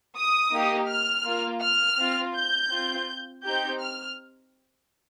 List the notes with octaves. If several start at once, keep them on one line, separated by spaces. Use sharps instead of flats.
D#6
A#3 D#4 G4
F6
A#3 F4
F6
C4 F4
G6
C4 F4
C4 D#4 G4 G6
F6